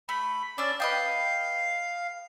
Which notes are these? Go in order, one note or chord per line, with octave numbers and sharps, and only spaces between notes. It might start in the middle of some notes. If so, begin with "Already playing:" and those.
A3 B5
C#4 D4 D5 E6
B4 D#5 F5 G5